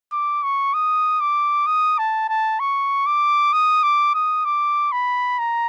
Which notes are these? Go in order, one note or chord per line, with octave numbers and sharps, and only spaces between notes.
D6
C#6
D#6
D6
D#6
A5
A5
C#6
D6
D#6
D6
D#6
D6
B5
A#5